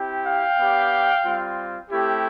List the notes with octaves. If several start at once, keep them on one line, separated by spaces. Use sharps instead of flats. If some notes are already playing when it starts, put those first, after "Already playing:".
Already playing: C4 E4 G4
F5 G5
B3 D4 G4
G3 C4 F4
A3 C4 E4 G4